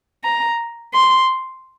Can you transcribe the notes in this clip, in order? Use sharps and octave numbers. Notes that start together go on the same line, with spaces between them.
A#5
C6